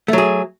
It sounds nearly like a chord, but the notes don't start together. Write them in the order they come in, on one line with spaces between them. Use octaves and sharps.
A3 F#3 G#4